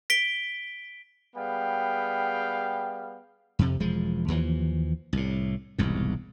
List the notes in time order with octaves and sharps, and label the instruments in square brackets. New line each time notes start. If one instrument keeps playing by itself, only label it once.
[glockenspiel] B6 D7 G7
[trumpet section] G3 B3 G#4 F5 G5
[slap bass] F2 C3
E1 F3 G#3
D#2 E3 F3
C2 A2
E1 C2 G#2